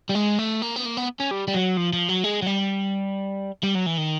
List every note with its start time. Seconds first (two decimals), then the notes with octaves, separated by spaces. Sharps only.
0.09 G3
0.15 G#3
0.39 A3
0.62 A#3
0.76 B3
0.86 A#3
0.97 B3
1.20 C#4
1.31 G3
1.48 G3
1.54 F#3
1.77 F3
1.93 F3
2.09 F#3
2.24 G#3
2.42 F#3
2.47 G3
3.63 G3
3.75 F#3
3.86 E3
3.98 D#3